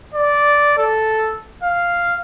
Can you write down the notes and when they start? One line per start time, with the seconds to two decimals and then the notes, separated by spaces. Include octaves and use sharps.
0.14 D5
0.78 A4
1.63 F5